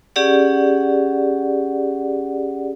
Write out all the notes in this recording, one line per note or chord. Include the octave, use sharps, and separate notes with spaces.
C#4 G4 G#4 D5 F#5